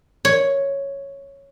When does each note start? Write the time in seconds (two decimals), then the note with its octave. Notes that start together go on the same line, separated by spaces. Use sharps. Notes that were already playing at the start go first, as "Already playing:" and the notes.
0.25 C#5